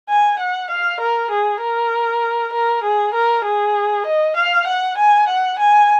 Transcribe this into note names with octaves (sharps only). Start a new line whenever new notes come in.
G#5
F#5
F5
A#4
G#4
A#4
A#4
G#4
A#4
G#4
D#5
F5
F#5
G#5
F#5
G#5